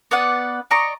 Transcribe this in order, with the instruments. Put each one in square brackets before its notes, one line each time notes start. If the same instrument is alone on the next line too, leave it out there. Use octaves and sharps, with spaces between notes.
[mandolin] B3 B4 D5 F#5
D5 D#5 A#5 C#6